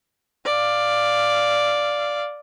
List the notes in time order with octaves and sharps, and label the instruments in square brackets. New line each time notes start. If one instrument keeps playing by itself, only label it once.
[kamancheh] D5 F5